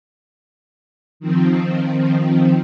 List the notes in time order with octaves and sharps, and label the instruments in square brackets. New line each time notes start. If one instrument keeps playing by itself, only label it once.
[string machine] D#3 F3 C4